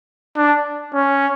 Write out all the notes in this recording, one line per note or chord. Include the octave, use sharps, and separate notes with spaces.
D4
C#4